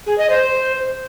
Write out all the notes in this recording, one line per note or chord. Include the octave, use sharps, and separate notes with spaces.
G#4
D#5
C5